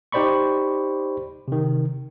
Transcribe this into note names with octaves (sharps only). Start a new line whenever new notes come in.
D#4 G4 C5 D5 B5 C#6
C3 D#3